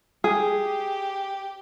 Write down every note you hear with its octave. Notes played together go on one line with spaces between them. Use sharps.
G4 G#4